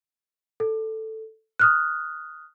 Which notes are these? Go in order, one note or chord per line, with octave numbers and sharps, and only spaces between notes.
A4
D#6 F6 F#6